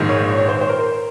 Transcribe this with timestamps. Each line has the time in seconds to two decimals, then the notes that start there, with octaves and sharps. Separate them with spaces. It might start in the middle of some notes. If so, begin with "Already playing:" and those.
Already playing: A#1 G#2 D#3
0.09 C#5
0.38 C#5
0.48 C5
0.61 C5
0.69 A#4